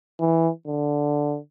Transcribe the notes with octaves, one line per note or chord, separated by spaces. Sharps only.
E3
D3